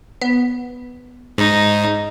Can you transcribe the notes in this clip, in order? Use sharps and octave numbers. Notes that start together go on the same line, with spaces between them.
B3
G#2 D#4